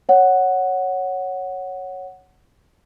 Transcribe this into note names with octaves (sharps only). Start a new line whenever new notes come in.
C#5 F#5